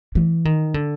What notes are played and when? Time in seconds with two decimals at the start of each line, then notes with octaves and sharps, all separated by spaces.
0.15 E3
0.45 D#3
0.74 D3